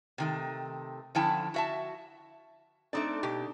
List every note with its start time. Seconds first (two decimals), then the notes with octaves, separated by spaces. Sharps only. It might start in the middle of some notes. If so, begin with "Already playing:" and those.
0.18 C3 D#3 A3
1.15 D3 F3 C#4 E4 G5 A5
1.54 F#4 E5 A5
2.93 A3 C4 D4 D#4 A4 D5
3.23 B2 G4